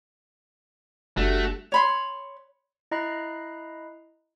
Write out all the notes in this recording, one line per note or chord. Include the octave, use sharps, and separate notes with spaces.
F#1 G3 A3 D4 F#4 G4
C#5 B5 C6
E4 D#5 A#5 B5 F#6 C7